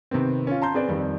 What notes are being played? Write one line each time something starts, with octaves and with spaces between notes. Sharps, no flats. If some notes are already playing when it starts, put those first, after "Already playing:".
C3 D#3 B3 C4
C#4 F4
A5 A#5 C6 G6
C4 G#4 B4 D5
F2 D#3 G3 C4